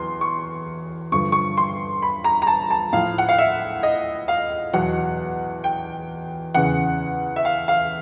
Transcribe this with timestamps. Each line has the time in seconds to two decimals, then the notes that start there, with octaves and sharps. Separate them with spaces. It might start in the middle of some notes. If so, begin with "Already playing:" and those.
Already playing: E2 F#3 C6
0.21 C#6
1.12 G2 D3 F3 C#6
1.32 C#6
1.57 C6
2.02 B5
2.24 A#5
2.42 A#5
2.47 A5
2.70 A5
2.93 A2 F3 F5
3.18 F#5
3.29 F5
3.38 E5
3.83 D#5
4.28 F5
4.73 E2 B2 F#3 F#5
5.64 G5
6.54 E2 C#3 E3 F#5
7.36 E5
7.45 F5
7.68 F5